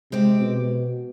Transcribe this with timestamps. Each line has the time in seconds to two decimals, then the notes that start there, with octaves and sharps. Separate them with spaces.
0.12 C3 G#3 C4 G4
0.40 B2